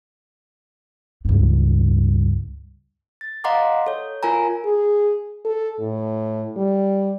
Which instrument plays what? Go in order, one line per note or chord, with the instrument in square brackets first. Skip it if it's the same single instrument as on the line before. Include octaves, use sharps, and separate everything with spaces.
[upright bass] C#2 G2
[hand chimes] A6
D#5 F5 F#5 A#5 C6 D6
A4 C#5
F4 A#4 G#5 A#5
[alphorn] G#4
A4
A2
G3